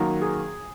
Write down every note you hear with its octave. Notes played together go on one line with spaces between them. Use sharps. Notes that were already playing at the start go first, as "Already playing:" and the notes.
Already playing: F#2 D#3 F#3 A#3
G#4